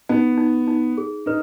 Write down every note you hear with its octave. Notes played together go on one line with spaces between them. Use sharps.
B3 D#4
D#4
D#4
G#4
D#4 B4